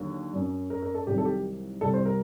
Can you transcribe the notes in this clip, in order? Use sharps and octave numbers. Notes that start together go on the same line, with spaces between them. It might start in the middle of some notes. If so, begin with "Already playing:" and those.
Already playing: D#2 D3 F#3
F#2 F#3
A#4
A#4
A4
C2 C3 D#3 F#3 G4
A4
G4
C2 C3 G3 A4
C5
A#4